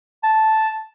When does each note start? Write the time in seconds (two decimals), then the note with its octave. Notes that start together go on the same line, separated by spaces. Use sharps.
0.23 A5